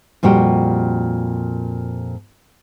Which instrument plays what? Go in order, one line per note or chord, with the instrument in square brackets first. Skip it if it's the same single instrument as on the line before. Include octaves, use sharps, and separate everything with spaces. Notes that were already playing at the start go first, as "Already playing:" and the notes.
[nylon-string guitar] F2 A#2 G3 F#4 G5